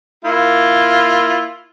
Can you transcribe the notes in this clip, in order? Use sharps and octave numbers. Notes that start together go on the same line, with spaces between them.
A#3 E4 F4